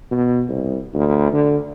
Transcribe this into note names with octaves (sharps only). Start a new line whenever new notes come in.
B2
C2
D2
D3